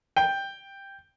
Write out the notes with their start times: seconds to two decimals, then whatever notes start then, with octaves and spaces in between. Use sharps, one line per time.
0.16 G5